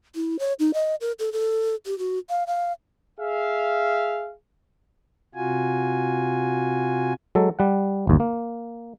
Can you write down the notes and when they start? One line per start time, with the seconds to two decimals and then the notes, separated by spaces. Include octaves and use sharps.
0.15 E4
0.39 C#5
0.59 D#4
0.74 D#5
1.01 A#4
1.19 A4
1.33 A4
1.86 G4
1.99 F#4
2.30 F5
2.47 F5
3.20 G#4 E5 F5
5.35 C3 F4 F#4 G#5
7.35 F#3 G#3 A4
7.59 G3 F#5
8.07 G1 D#2
8.20 A#3